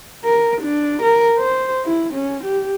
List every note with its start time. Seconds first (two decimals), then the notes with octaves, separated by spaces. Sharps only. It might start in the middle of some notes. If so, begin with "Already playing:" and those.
0.24 A#4
0.61 D4
1.02 A#4
1.39 C5
1.85 E4
2.14 C#4
2.44 G4